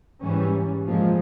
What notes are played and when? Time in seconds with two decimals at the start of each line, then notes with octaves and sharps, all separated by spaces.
0.23 G#2 E3 G3 C#4
0.87 A#2 F3 G#3